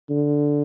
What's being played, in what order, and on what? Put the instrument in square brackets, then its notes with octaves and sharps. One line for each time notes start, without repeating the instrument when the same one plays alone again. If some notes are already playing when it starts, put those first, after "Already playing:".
[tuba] D3